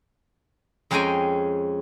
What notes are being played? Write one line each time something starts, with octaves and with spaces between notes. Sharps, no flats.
F2 G#3 C#4 G5 G#5 A#5